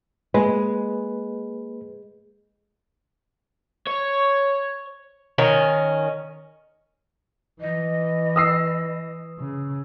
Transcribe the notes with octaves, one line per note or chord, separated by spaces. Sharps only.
G#3 A#3 B4
C#5
D#3 C#4 A#4
E3 D#5
D#6 E6 C7
C#3